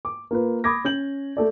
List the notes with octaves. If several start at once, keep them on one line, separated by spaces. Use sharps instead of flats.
D6
A#3 F4 B4
B5 D6 D#6 G#6 A#6
C#4 G6 F#7
A3 A4 D5